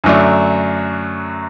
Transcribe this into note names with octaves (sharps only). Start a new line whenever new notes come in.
F#2 D3 F#3 A3 D4